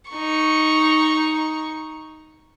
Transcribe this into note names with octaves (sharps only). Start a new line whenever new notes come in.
D#4 C#6